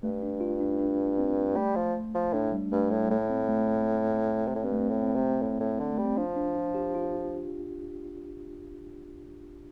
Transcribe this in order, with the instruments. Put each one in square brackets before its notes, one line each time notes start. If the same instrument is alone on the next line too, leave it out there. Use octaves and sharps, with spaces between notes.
[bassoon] G2 [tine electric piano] A3
[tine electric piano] D4
F4
D4
D4
C4
[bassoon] G3 [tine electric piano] A3
[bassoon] F3
F3
[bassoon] A2 [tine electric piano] D4
[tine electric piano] G3
[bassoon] G2 [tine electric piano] A3
[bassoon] A2
[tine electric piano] G3
[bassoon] A2 [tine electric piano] A3
[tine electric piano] C4
A3
A3
[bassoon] C3
A2
[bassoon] G2 [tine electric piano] C4
[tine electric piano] A3
C4
[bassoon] A2
[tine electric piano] C4
[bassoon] C3
A2
A2
D3
[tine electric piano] A3
[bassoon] G3
[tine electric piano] C4
[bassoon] F3 [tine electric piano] D4
[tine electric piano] D4
F4
G4
F4